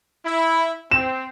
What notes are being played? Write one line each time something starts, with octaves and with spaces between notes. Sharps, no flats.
E4
C4 E7